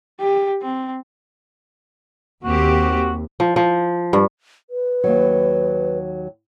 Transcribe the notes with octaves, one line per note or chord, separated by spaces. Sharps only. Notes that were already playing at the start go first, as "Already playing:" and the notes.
G4
C4
D#2 A#3 C4 F#4 G4
F3
F3
G2
B4
D#2 F#3